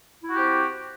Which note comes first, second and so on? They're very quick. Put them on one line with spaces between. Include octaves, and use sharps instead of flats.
E4 F#4 G4 C4